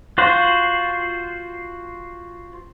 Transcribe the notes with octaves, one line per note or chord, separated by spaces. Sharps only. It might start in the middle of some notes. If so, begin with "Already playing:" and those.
F4 F#4 C5 F#5